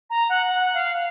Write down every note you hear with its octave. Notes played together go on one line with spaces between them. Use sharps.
A#5
F#5
F#5
F5